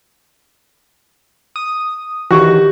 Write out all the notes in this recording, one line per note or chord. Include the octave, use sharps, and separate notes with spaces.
D#6
D#3 E3 F#4 G4 C#6